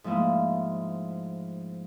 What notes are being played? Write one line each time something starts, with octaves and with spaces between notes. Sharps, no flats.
G#2 F3 A3 A#3 E4